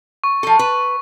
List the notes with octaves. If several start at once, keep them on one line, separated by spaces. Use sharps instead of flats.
C#6
F3 A4
B4